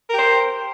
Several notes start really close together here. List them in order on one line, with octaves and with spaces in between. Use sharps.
A#4 G4 C5